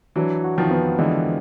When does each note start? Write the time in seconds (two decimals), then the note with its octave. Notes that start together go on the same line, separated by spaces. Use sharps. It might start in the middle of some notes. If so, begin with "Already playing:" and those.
0.16 E3 F#3 D4
0.44 F#4
0.58 D#3 F3
0.71 B3
0.99 D3 E3 G#3